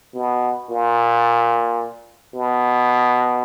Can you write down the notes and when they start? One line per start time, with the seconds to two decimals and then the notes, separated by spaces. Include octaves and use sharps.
0.14 B2
0.70 A#2
2.35 B2